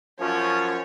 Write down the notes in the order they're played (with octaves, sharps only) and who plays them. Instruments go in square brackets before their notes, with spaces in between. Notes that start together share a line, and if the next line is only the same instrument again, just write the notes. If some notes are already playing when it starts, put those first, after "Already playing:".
[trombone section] F#2 F3 C#4 [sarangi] C#5